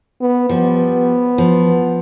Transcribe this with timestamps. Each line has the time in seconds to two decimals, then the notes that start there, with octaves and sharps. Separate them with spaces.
0.21 B3
0.49 F3 G3 B3
1.38 F3